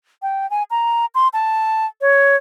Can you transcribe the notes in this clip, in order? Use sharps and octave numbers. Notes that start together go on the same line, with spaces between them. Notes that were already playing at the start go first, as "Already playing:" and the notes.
G5
G#5
A#5
C6
A5
C#5